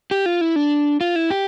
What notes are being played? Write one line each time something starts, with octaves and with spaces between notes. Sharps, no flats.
G4
F4
E4
D4
F4
E4
G4